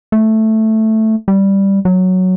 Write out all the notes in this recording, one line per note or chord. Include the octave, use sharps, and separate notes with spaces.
A3
G3
F#3